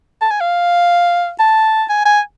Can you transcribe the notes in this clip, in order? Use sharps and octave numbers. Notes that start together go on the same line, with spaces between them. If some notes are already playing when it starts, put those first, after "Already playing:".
A5
G#5
F5
A5
G#5
G#5